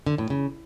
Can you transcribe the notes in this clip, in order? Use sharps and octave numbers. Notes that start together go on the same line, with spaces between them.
D3
A2
C#3